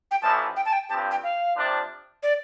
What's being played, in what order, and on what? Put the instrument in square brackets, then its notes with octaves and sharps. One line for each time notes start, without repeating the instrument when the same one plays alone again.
[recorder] G5
[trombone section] A1 A2 F3 A3 [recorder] A5
[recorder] G5
A5
G5
[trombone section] G2 F3 C4 G4 [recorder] A5
[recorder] G5
F5
[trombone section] C3 F3 D4
[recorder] D5